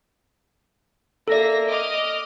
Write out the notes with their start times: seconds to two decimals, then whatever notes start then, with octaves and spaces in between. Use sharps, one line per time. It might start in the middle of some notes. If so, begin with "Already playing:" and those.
1.28 A#3 A4 D5 E5 A#6
1.66 D#5 D6 F6